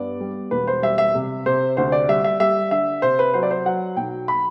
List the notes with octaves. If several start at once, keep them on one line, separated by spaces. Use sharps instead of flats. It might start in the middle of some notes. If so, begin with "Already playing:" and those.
Already playing: G2 B3 D5
G3
E1 B4
C5
G3 E5
E5
C3
C3 C5
D2 C5
D5
G3 E5
E5
G3 E5
D3 E5
C3 C5
B4
F#3 C5
D5
C5
F#3 F#5
B1 G5
B5